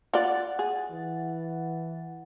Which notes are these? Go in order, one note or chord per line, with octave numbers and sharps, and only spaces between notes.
F4 D5 F#5 A6
G#4
E3